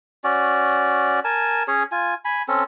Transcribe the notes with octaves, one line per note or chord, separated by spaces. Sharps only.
C#4 F#4 D5
A#4 G#5 A5
C#4 G#4 C#5
F4 G#5
G#5 B5
C4 C#4 A4